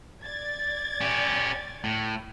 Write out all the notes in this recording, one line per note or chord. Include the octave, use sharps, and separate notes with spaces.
D5 G#6 A6
C#4 G4
A2